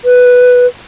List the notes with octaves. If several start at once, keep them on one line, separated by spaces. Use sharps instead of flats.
B4